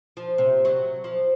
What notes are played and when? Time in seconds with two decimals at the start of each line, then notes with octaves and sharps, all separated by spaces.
0.17 F3
0.38 C3
0.65 F#3
1.04 F3